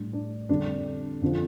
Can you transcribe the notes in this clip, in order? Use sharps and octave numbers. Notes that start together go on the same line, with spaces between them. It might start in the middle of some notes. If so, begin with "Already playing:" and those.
Already playing: A2 G3 D4
D4
F2 D3 G3 D4
F2 D3 F3